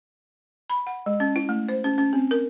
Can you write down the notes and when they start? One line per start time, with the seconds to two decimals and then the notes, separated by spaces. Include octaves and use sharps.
0.70 B5
0.87 F#5
1.06 G#3
1.20 C#4
1.36 E4
1.49 A3
1.69 C5
1.84 C#4
1.98 C#4
2.13 C4
2.31 A#4